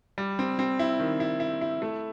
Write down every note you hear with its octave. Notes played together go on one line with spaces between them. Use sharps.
G3
C4
C4
E4
D#3
E4
E4
E4
A3